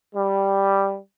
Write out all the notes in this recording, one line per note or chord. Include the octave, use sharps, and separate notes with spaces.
G3